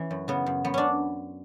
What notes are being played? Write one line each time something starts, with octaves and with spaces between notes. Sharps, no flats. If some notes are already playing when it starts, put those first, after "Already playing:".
Already playing: E3 C#4
F#2
C#3 B3
F#2
F#2 B3
C#4 D4